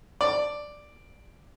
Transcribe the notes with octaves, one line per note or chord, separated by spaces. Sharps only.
D5